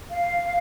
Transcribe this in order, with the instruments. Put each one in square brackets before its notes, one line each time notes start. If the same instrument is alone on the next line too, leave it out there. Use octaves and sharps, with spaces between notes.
[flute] F5